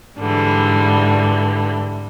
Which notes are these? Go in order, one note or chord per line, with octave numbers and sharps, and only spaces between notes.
G#2 D3 E3 G3